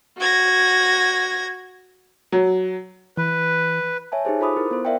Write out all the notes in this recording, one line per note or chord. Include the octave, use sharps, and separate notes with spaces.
F#4 G#6 A#6
F#3
E3 B4
C#5 E5 G#5 A5
D#4 G4 G#4 C5
F4 A4 C5 B5 D6 D#6
E4 A#4
B3 C5
A#4 D5 E5 F5 G5